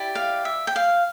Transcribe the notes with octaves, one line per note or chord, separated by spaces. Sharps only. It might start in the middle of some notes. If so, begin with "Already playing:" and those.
Already playing: E4 G4 D5
F5
E5
G5
F5